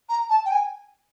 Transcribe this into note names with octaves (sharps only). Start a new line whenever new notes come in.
A#5
A5
G5
G#5